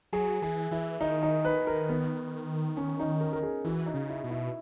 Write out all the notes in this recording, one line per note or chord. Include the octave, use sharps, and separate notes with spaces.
F#3 G#4
E3 G#4
E3 E4
D#3 D#4
D#4
B4
A#4
B3
C#4
D#4
A#4
A#4
G#4
E3 F#4
D#4
C#3
E4
B2
E4